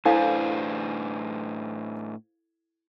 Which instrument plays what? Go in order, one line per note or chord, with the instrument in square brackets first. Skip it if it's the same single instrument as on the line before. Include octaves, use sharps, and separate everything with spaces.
[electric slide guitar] A2 D4 B4 [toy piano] E4 A4 F5 [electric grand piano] C5 G#5